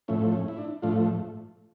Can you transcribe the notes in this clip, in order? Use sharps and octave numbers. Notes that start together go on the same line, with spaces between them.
A2 F3 A3 C#4 E4
C#4
E4
D4
A2 F3 A3 D4 F4